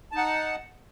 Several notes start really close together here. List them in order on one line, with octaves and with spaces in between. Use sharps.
A5 D#4 F#5